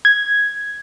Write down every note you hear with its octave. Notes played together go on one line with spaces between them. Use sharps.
G#6